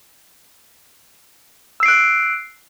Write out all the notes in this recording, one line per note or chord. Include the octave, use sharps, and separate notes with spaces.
E6 F#6 C7 D7